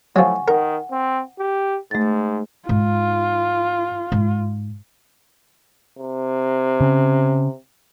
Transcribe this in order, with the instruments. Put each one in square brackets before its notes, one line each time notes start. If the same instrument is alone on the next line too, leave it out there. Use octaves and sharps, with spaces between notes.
[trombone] A2 [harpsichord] F3 F#3 [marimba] F#5 G#5 C#6
[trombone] D#3 [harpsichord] A#4 [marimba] F#5
[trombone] C4
G4
[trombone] G#2 [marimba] A3 A6
[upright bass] G#2 D#4 [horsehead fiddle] F4
[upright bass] G#2
[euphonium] C3
[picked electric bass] C#3 C#4